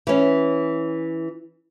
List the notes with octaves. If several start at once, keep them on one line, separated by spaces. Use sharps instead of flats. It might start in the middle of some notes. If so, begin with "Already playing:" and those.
E3 C#4